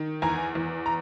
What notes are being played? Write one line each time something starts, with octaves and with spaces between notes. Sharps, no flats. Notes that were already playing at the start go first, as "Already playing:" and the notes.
Already playing: D#3
E2 G#5 A#5
E2
A#5